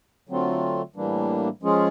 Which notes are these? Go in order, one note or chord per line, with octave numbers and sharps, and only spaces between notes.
D3 F#3 A3 C4 F4
A2 E3 G3 A#3 D4
F3 G#3 C#4 F4 G#4